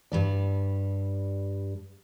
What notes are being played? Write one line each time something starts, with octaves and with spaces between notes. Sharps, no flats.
G2 G3 D5